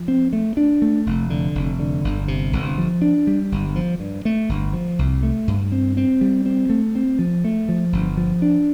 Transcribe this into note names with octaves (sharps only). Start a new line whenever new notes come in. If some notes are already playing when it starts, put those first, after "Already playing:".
Already playing: F3
C4
A3
D4
A3
F1
D3
F1
D3
G1
C3
G1
F3
D4
G3
G1
F3
G2
A3
G1
F3
C2
A3
G2
C4
C4
G3
C4
A3
C4
F3
A3
F3
G1
F3
D4